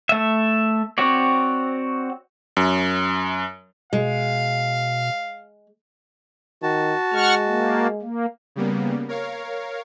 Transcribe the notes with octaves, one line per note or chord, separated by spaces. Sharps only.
A3 E5
C4 F#4 C#5 D5
F#2
B2 G#3 F5
D#3 F#4 A5
G#3 F#5 C#6 F6
A#3
A#3
C#3 G3 A#3 B3
A#4 C#5 F5